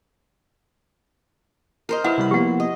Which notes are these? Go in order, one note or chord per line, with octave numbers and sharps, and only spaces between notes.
A#4 C5 D#5
E4 A#4 B4 F#5
C3 G3 B5
F3 A#3 B3 G4 F#5
D#5